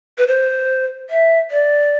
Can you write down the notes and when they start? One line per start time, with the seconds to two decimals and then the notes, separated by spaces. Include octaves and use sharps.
0.18 B4
0.28 C5
1.10 E5
1.51 D5